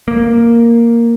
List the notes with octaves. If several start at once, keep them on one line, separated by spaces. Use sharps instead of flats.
A#3